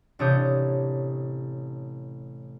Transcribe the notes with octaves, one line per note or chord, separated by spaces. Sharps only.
A1 C3 D4 C#5 D#6 G6